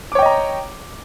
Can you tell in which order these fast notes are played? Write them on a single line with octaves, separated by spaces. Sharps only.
D6 C#5 G5 D#5 A#5